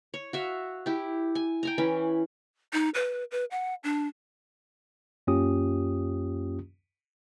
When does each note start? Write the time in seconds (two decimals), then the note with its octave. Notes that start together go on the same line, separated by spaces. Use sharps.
0.14 C#5
0.33 F#4 E5 F5
0.86 E4 G4
1.35 G#5
1.63 G5 G#5 A#5
1.78 E3 C#4 B5
2.73 D#4
2.95 B4
3.31 B4
3.51 F#5
3.84 D4
5.27 F#2 A#3 C#4 F4 G4 D#6